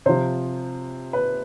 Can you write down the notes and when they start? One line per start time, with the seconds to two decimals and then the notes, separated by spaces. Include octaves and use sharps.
0.06 C3 F3 C5
1.13 B4